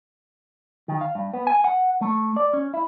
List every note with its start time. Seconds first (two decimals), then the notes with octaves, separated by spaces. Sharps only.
0.88 D#3
1.01 F5
1.15 G2
1.33 B3
1.47 G#5
1.64 F#5
2.01 A3
2.36 D5
2.53 C#4
2.74 E4